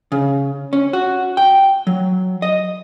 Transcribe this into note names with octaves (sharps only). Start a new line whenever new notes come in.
C#3
C#4
F#4
G5
F#3
D#5